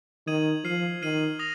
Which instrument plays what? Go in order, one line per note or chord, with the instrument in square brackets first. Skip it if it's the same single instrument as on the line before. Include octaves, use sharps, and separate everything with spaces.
[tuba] D#3 [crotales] D#6 G#6 D#7 F#7
[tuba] F3 [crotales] F6 C7 D#7 F#7
[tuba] D#3 [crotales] F6 C7 D#7 F#7
[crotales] D#6 A#6 F7